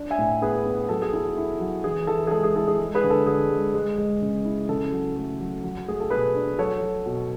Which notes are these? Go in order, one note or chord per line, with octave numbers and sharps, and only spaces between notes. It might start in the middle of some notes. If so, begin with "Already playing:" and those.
Already playing: D4
E5 G#5
A2
B3 G#4 B4
B3
F#3 A4
G#4
E4 A4
E4
F#3
E3 G#4
E3 A4
G#4
G#3 A4
G#4
E4 A4
G#4
G#3
G#4 B4
D3
A4
D3 G#4
G#3
G#3
G#3
C#3
E4
C#3 A4
F#3
A3
F#3
F#3
A3 G#4
A4
B2 G#4 B4
D4
F#3 A4 C#5
F#3
B2